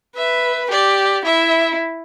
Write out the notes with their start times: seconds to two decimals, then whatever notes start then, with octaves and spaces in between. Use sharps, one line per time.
0.16 B4 E5
0.71 G4 D5
1.25 E4 E5